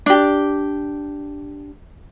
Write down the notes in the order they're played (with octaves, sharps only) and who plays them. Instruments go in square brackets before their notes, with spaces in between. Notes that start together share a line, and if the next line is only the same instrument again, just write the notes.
[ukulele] D4 G4